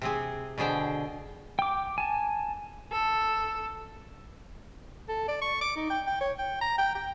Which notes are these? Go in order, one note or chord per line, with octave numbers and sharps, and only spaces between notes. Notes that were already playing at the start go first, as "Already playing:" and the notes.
C3 C4 G#4
B2 D3 G#4 C5 G5
G5 D6
G#5 A5
A4
A4
D5
C#6
D6
D#4
G5
G5
C#5
G5
A#5
G5
G5